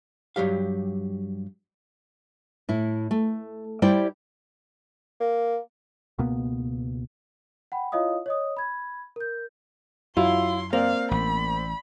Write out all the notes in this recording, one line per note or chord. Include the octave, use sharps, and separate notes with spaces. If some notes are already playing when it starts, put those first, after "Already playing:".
G2 F#3 G4 F5
A2 E4
A3
G3 E4 G4 C5 D5 G5
A#3
C#2 B2 A#3 B3
F#5 G5 B5
E4 F4 C#5 D#5 F5 D#6
C#5 D#5 D#6
B5 G#6
A#4 G6
F#2 F#3 E4 F4 C6
A#3 C4 D5 F5
A1 B5